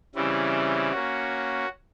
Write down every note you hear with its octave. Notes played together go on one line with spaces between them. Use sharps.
C#3 E3 G3 C4 E4
A#3 C#4 F#4